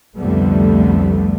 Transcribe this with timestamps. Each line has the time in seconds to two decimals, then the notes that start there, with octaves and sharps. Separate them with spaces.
0.17 C2 F2 D3 G3 A3 B3